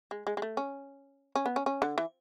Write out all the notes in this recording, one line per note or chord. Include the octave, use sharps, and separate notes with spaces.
G#3
G#3
G#3
A3
C#4
C#4
B3
C#4
C#4
D3
E3